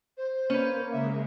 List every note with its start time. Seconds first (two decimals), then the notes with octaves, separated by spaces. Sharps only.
0.18 C5
0.50 A#3 C#4 B4
0.93 C#3 G#3 E5